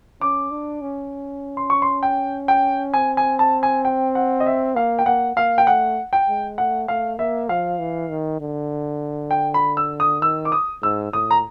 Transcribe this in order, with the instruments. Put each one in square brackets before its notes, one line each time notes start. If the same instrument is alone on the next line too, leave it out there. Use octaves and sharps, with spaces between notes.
[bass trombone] C#4 [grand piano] D6
[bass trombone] D4
C#4
[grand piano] C6
C#6
C6
G5
G5
[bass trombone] C4 [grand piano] G#5
[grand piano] G#5
A5
G#5
G5
F#5
D#5
E5
[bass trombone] A#3 [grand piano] F5
[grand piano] G5
[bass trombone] A#3 [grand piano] F#5
[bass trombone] A#3 [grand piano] F5
[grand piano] G5
[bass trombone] A3 [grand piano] F#5
[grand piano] G5
[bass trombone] G#3
[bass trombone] A3 [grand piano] F#5
[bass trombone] A3 [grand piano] F5
[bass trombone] A#3 [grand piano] E5
[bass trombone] F3 [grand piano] F5
[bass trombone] E3
D#3
D3
[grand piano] G5
B5
E6
D#6
[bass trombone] D#3 [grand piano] E6
[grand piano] D6
D#6
[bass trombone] G#2 [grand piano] E6
[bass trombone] A2 [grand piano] D#6
[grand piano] A#5